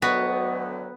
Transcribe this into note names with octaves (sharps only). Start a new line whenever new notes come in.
D2 D#3 F#3 B3 F#4